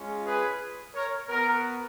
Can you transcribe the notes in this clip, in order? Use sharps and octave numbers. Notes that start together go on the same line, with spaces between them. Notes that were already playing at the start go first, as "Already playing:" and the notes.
Already playing: G#3 C#4 F4
G#4 B4
A#4 C#5
B3 F#4 A#4